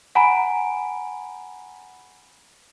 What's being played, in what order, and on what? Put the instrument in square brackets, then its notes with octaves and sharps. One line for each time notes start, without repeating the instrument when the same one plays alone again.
[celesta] F#5 G#5 A#5 B5 D7